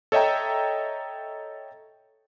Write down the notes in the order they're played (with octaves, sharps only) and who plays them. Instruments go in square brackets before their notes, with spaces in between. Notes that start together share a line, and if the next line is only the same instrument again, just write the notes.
[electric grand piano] A4 C#5 D#5 E5 G5 A#5